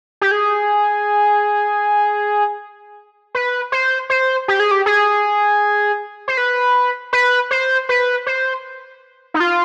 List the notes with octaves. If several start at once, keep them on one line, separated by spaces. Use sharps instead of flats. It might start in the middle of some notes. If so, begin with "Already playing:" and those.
G4
G#4
B4
C5
C5
G4
G#4
G4
G#4
C5
B4
B4
C5
B4
C5
D#4
F4